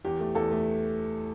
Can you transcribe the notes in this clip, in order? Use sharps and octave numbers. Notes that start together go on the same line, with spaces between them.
E2 G4
A3
E2 A4
A3